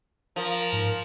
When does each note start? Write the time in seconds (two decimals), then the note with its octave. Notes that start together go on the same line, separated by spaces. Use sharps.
0.36 F3 A#4
0.73 G#2